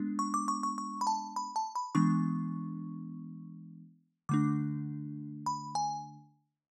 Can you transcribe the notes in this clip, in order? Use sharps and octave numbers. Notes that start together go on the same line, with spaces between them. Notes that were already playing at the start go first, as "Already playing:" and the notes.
Already playing: G#3 B3 D4
C#6
D6
C#6
C#6
C#6
B5
A5
B5
A5
B5
E3 G#3 B3 D4 C#6
D3 A3 D4 D6
B5
G#5